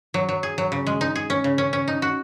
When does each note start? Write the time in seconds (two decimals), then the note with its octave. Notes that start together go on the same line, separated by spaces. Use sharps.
0.14 F#3
0.29 F#3
0.43 G#4
0.58 F#3
0.72 C#3
0.87 G#3
1.01 D#4
1.15 G#4
1.30 C#4
1.44 C#3
1.58 C#4
1.73 C#4
1.88 D#4
2.02 F#4